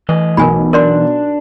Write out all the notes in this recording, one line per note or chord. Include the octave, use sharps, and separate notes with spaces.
A2 E3 D#5
B1 A#4 G#5 B5
D4 A#4 D5 C6